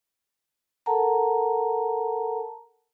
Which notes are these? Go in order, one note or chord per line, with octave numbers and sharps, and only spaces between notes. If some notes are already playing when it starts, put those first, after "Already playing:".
A4 A#4 F#5 A5 A#5